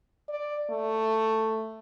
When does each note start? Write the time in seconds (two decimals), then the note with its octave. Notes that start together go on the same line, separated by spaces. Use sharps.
0.29 D5
0.70 A3